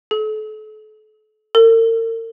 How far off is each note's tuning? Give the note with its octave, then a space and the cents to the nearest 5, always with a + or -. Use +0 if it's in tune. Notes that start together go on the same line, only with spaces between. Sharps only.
A4 -35
A#4 -45